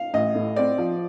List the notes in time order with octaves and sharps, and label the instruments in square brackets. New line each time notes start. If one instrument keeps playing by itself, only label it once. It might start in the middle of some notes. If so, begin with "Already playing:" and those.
Already playing: [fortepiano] F5
[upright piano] A1 [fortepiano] D#5
[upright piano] A2
[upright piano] C4 [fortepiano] D5
[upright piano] F3